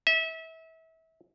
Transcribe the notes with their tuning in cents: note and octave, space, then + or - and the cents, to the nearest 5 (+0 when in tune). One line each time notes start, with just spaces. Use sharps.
E5 -30